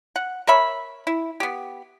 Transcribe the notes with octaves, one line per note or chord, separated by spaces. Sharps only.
F#5
A#4 C#5 E5 B5
E4
B3 G4